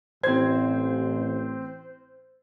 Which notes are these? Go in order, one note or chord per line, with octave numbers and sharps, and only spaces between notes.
A1 C4 C5 G#6